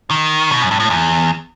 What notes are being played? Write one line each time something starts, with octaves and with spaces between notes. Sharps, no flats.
D#3
B2
F#2
G2
A2
E2